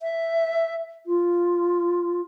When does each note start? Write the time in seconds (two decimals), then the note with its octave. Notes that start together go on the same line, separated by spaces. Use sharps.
0.01 E5
1.06 F4